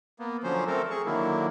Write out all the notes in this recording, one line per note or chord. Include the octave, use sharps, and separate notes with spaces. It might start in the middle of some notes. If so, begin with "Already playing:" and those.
A#3 B3
D3 F3 F#3 C#4 C5
A3 C4 A4 A#4
G#4 C#6
D3 D#3 F#3 A#3 E4